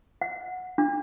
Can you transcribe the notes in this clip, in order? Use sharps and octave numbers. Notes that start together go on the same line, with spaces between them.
F#5
D4